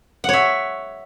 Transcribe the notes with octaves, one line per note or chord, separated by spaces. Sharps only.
C#5 E5 F#5